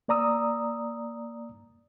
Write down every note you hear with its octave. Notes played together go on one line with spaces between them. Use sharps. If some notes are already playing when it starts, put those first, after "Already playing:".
A#3 D5 A#5 D#6 E6